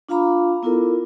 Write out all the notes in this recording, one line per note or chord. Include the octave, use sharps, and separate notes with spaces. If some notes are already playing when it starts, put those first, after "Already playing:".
D4 F4 F5 A#5 B5 D6
B3 E4 F4 A4 A#4